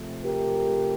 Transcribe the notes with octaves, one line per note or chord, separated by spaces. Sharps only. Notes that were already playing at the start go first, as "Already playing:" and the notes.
Already playing: C3 F3 A3
G4 A#4